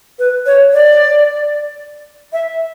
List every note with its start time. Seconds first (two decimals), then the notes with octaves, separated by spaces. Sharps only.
0.19 B4
0.46 C#5
0.73 D5
2.33 E5